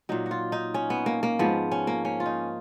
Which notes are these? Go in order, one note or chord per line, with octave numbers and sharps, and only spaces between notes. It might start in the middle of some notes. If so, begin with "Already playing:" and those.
A#2 F#3 D#4
F#4
F4
D#4
C#4
B3
A#3
A#3
G#2 F3 B3
C#4
A#3
C#4
F4
D#4